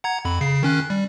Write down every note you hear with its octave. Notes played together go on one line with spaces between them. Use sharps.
F#5 A#5 G#6
F2 B5
C#3 C7
D#3 C#4 F#6
G3